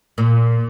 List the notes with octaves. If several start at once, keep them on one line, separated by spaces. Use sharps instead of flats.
A#2